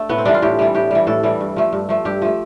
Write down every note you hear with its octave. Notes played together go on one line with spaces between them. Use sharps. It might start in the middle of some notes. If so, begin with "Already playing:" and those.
Already playing: A3 D4
A2 B3
C4
E3 G3 D4
F4
A2 G4
E3 G3
A2 G4
E3 G3
A2 A4
E3 G3
G2
F3 A3
G2
F3 A3
G2 G4
F3 A3